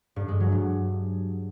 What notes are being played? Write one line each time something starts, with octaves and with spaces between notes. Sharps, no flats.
G2
G#3
F#3
G2